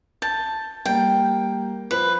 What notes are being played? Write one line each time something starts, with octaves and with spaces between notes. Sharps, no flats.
A5 G6
G3 A#3 G5
F3 B4 C5